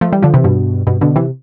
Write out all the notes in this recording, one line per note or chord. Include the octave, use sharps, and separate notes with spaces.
F3 A3
E3 G3
D3 F3
C3 E3
G2 B2
G2 B2
B2 D3
C3 E3